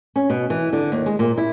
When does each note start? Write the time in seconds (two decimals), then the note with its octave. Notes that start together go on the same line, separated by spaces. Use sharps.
0.16 C#4
0.30 B2
0.50 E3
0.73 D3
0.92 D#2
1.06 G#3
1.19 A#2
1.38 E4